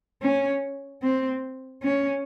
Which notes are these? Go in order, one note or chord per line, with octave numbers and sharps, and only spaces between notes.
C#4
C4
C#4